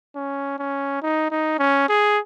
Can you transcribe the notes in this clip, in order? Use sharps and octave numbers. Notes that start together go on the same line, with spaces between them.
C#4
C#4
D#4
D#4
C#4
G#4